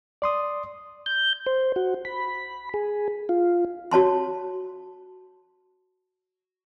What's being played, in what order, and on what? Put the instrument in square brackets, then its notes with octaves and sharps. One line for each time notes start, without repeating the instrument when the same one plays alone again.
[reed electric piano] D5 C6 D#6
[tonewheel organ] G6
C5
F#4
B5
G#4
F4
[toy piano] F#4 C#5 A5 C6